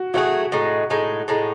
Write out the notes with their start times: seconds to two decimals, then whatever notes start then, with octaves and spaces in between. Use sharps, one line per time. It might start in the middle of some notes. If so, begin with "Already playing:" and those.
Already playing: F#4
0.14 F#3 A3 D#4 F#4 G#4
0.52 A2 G#3 D#4
0.90 A2 G#3 D#4
1.28 A2 G#3 D#4